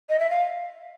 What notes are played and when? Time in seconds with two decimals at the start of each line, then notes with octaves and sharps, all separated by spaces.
0.09 D#5
0.19 E5
0.30 F5